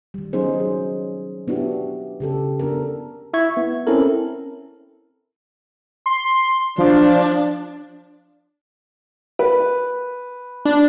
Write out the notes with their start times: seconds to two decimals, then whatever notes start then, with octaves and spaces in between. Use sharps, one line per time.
0.14 D#3 G3
0.33 F#3 B3 C#4 D#4 G#4 C5
0.60 G#4
1.48 B3 D4 E4 F#4 G4
2.20 C#3 G4 A4
2.60 B3 D4 A4 A#4
3.34 E4 E5 C#6 G#6
3.57 B3
3.87 C4 C#4 E4 A4 A#4
6.06 C6
6.78 F3 D4
9.39 B4
10.65 D4